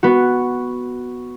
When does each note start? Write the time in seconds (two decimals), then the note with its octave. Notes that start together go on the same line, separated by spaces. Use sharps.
0.03 B3 F#4